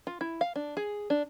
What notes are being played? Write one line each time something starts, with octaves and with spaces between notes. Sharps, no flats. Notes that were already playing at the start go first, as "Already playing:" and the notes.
F4
E4
F5
D4
G#4
D4